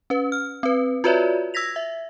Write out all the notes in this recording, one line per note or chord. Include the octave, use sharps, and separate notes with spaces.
C#4 B4
F6
C4 B4
F4 F#4 B4 C#5 D5 E5
E6 G#6 A#6 B6 F7
E5